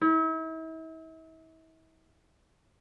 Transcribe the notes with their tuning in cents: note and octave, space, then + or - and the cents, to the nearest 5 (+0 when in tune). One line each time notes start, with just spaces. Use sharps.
E4 -40